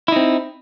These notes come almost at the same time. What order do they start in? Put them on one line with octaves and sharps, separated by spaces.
E4 D#4 C4